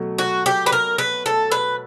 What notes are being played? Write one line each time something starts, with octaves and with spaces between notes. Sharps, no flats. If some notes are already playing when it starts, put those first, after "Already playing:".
Already playing: B2 F#3 A3
F#4
G4
B4
A#4
B4
A4
B4